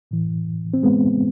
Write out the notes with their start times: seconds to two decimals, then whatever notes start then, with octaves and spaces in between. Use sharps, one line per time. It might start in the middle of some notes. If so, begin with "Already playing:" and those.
0.11 A2 E3
0.74 C4
0.83 G#3 B3